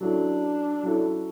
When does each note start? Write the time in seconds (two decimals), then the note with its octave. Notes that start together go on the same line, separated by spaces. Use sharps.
0.01 F#3 C#4 D4 E4 A4
0.83 F#3 C#4 E4 A4